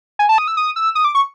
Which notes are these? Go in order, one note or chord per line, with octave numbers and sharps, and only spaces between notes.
G#5
A5
D#6
E6
D#6
E6
D#6
D6
C#6